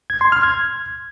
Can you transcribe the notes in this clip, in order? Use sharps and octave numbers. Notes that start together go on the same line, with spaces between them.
G#6
C6
F6
G#6